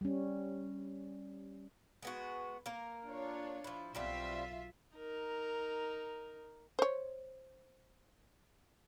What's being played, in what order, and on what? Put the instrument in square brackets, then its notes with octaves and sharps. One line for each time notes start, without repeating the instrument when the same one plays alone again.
[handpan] G3 C#4
[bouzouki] G#3 B3 F#4
A#3 A#4
[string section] D4 F4 C#5
[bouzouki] F3 E4
[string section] B1 F4 E5 [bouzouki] B2 G3 C4
[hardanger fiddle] D#4 A#4
[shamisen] C5 C#5